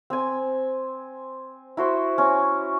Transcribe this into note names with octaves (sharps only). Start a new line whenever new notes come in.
C4 G#5
E4 F#4 C5
C#4